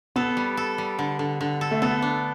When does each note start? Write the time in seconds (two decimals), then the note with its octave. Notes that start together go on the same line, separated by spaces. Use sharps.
0.16 B3 A4
0.37 G3
0.57 A4
0.78 G3
0.99 D3
1.19 D3
1.41 D3
1.61 A4
1.71 A3
1.82 B3 A4
2.02 D4